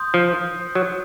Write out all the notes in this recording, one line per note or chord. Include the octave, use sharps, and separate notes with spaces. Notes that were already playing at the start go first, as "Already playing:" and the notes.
Already playing: C6 D#6 G6
F3
F#3